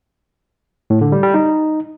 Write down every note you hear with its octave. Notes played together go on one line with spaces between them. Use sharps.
A2
D3
G3
G3
D#4